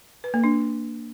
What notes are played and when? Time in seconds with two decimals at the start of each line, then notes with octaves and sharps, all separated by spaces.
0.24 B4
0.34 A#3
0.44 D4